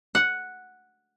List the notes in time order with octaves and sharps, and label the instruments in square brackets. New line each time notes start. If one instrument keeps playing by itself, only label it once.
[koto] F#5